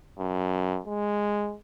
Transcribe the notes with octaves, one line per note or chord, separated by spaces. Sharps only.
F#2
G#3